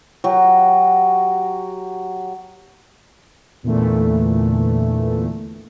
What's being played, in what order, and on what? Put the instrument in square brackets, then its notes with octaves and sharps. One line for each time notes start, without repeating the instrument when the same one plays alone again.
[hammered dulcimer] F#3 G4
[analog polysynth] E2 A#2 D3 E3 A3